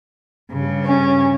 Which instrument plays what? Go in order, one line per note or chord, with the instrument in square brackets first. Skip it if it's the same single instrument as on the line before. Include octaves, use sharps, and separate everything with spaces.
[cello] G2 C#3
[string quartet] C#4